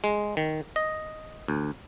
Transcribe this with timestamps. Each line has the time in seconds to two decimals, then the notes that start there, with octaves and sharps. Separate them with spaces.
0.04 G#3
0.37 D#3
0.76 D#5
1.48 D2